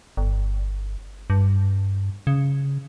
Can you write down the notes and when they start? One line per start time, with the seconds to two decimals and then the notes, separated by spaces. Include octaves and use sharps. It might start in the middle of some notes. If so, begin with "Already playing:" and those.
0.17 G1
1.30 G2
2.27 C#3